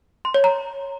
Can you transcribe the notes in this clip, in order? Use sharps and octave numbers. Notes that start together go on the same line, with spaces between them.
C6
C#5
A#5